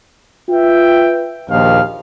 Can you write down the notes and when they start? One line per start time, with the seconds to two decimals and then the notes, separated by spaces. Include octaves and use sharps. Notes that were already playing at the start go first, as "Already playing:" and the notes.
0.50 F4 B4 E5 G5
1.49 A#1 D#2 D#3 F3 F5